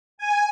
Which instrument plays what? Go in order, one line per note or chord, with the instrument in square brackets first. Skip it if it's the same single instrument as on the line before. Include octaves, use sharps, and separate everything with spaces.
[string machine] G#5